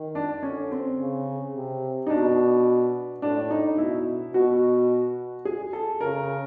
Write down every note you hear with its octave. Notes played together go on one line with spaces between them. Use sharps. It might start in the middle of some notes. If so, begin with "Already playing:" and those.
Already playing: D#3
D4
D3 C#4
C4
C#3
C3
D#4
B2 D4
A2 D4
D#4
B2 E4
B2 F#4
G#4
A4
C#3 A#4